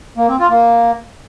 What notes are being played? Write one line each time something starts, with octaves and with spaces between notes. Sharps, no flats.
A#3
C4
F4
A#3